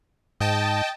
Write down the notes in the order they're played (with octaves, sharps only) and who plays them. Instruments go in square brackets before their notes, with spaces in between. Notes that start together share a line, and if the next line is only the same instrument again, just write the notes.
[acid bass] G#2 [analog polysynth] D#5 G5 A5